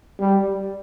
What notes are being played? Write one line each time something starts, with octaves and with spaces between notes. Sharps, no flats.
G3